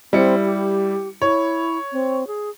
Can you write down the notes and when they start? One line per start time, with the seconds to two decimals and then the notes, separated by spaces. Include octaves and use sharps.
0.13 G3 C4 E4 C#7
0.45 G4
1.22 E4 C#5
1.92 C4
2.27 G#4